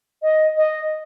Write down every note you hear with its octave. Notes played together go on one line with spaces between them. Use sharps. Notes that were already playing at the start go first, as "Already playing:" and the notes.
D#5
D#5